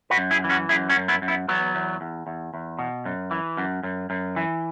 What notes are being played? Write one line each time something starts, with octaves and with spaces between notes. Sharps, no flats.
F#4 B4
F#2
E4 G#4
E3
C#4 F#4
F#2 E4 G#4
C#4 F#4
F#2
B3 E4
F#2
B3 E4
E2 F#3 B3
E2
E2
E2
E2
B2
F#2
E3
F#2
F#2
F#2
E3